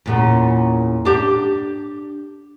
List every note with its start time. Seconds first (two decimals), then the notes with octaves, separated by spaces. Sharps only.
0.06 E2 A#2 C#3
1.05 D4 G4